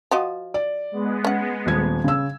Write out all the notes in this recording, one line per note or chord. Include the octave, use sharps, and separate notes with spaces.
F3 F#4 D#5
D5
G#3 B3
C#4 F#5
D#1 G#6
C#3 E6